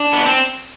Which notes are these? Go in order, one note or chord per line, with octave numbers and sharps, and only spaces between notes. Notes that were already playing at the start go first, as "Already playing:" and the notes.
Already playing: D4
B3
C4